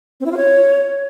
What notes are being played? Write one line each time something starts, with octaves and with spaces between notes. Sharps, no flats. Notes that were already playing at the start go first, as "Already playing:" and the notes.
C4
E4
F4
C#5